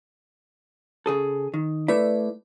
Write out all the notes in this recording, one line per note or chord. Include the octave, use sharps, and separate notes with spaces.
C#3 G#4 A4
D#3
A3 E4 B4 D5